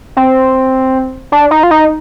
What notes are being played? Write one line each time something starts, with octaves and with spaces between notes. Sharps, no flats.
C4
D4
D#4
F4
D#4